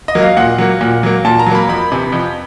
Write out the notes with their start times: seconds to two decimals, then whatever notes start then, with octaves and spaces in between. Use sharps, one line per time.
0.08 D#5
0.15 F#3 A#3
0.23 F5
0.37 A#2 F#5
0.58 F#3 A#3
0.81 A#2
1.03 F#3 A#3
1.25 A#2 A5
1.39 A#5
1.46 F#3
1.52 A#3 B5
1.69 F2 B5
1.92 C3 E3
2.12 F2